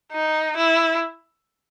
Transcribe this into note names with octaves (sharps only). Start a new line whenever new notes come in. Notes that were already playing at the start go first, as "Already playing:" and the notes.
D#4
E4